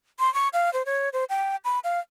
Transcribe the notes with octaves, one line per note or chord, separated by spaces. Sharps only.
C6
C#6
F5
C5
C#5
C5
G5
B5
F5